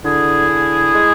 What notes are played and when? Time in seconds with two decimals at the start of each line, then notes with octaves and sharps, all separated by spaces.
0.04 D3 E4 G#4
0.49 D3
0.94 G#3